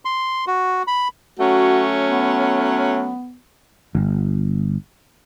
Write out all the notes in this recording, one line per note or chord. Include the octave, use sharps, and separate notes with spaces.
C6
F#4
B5
F#3 A3 C#4 F#4
B3
G1